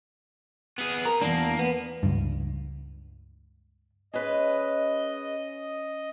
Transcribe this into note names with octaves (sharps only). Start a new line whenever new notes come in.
B3 G#4
A#4
E2 G2 A#3 D4
B3
C#2 G2
G#3 C#4 B4 D#5